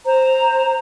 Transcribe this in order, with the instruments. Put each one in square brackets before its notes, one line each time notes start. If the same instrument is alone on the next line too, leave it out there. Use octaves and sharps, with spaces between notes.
[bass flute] C5 [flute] A#5